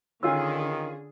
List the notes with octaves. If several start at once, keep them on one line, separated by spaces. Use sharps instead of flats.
D3 D#3 C#4 D4 F4 G#4 E6